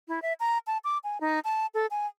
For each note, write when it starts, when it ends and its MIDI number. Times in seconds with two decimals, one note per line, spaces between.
0.08 0.22 64
0.22 0.33 76
0.40 0.58 82
0.67 0.78 81
0.84 0.98 86
1.04 1.20 80
1.21 1.40 63
1.44 1.66 81
1.74 1.86 69
1.91 2.07 80